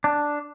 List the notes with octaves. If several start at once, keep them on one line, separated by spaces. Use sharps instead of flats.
D4